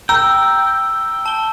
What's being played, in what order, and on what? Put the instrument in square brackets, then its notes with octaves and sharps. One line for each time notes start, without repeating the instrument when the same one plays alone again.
[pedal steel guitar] G5 [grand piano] A#5 [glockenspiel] E6
[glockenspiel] A5 G7